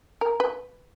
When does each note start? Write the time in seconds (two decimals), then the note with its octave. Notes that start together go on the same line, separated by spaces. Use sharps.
0.21 A#4
0.40 B4